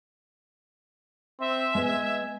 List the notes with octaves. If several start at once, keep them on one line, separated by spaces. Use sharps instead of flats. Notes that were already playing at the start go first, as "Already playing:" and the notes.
C4 E5
G#3 B3 D#5 G#5